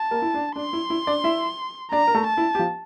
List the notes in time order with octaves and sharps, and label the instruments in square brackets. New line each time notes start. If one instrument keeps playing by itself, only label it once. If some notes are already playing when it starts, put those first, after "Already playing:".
Already playing: [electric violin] A5
[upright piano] A#3 A#4
E4
D4
[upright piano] D4 [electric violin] C6
[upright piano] E4
E4
D4 D5
E4 E5
[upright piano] D4 D5 [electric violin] A#5
[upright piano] A#4
A3 A4
[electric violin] A5
[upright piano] E4
G4
F3 F4